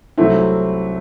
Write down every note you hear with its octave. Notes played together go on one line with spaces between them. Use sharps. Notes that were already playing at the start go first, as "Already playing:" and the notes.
C2 C3 F#3 A3 C4 E4